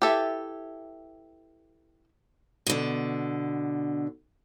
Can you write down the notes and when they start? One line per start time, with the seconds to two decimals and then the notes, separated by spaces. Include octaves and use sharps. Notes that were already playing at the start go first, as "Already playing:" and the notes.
0.02 E4 G4 A4 B4 E5
2.67 B2 D3